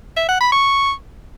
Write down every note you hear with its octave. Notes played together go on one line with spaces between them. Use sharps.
E5
F#5
B5
C#6